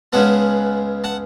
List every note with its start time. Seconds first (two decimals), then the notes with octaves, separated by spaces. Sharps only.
0.13 C#2 C#3 G#3 B3 F#5 A5
1.04 F#5 A5